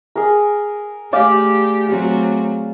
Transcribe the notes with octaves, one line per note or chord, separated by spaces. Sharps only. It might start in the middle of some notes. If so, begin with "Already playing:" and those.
G#4 A#4
A3 G4 D5 F5 G#5
F#3 A3 C4